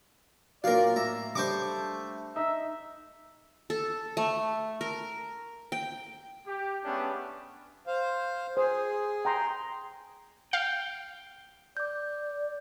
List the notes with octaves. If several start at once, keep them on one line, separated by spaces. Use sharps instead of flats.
A#2 F#3 A#4 D5 F5
A2 A#3 E5 A#5
G3 A3 D4 C5 C#6 D6
D#4 E5
A4
A3
A#4
G5
G4
G#3 A3 B3 C#4 D4 G4
C5 F5
G#4 C5
G5 A#5 C6
F5 G5
D5 D6 G6